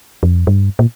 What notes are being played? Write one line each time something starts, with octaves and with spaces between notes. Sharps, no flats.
F2
G2
A#2